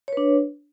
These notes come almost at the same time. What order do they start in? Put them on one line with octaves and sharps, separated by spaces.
C#5 B4 D4